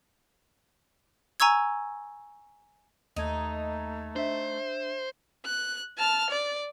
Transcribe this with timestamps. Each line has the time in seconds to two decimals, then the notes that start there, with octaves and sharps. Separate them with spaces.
1.40 G#5 A#5 C#6 E6 G#6
3.16 D#2 A3 D#4 D#5 G#6
4.16 D4 C5 E5
5.46 F#6
5.98 A5 F6
6.30 D5